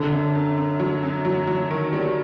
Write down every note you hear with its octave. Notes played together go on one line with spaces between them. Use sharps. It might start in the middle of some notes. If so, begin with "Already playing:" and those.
Already playing: F#2 D3
F#2
F#2
F#2
F#3
F#2
F#3
F#3
D#3
G3